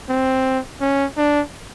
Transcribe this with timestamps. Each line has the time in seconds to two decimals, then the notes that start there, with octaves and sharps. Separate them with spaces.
0.09 C4
0.81 C#4
1.17 D4